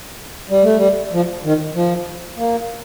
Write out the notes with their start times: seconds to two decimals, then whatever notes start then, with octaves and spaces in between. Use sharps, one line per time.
0.50 G3
0.63 A3
0.77 G3
1.12 F3
1.44 D#3
1.75 F3
2.37 A#3